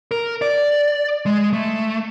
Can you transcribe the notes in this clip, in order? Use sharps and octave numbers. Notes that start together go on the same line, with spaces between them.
A#4
D5
G#3
A3